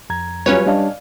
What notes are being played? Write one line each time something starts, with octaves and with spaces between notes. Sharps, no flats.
F2 A#5 G#6
F#3 G3 C#4 F4 B4 C#5
G3 D4 D5 D#5 F5 A5